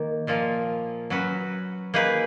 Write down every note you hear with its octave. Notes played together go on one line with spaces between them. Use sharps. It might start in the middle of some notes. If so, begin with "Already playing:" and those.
Already playing: D#3 A#3
A#2 F3 A#3 F4
F#3 C#4 F#4 B4
A#3 D#4 G#4 B4